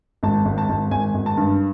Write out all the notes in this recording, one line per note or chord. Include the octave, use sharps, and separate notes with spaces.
G#1 A5
G#1
A5
G#1
G#1 G#5
G#1
A5
G2